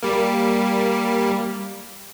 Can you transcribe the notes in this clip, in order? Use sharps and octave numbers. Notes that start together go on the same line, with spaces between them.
G3 A#3